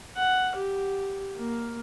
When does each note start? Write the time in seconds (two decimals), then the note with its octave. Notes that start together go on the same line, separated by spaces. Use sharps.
0.16 F#5
0.56 G4
1.37 A#3